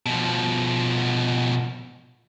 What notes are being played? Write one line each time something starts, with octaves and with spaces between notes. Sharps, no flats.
B2 F3